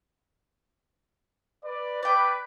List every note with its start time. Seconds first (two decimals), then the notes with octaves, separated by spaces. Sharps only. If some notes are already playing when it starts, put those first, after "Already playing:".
1.64 B4 D5
2.03 B4 D5 G5